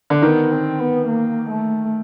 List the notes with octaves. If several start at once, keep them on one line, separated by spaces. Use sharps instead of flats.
D3
D#3 B3
C4
B3
A#3
A3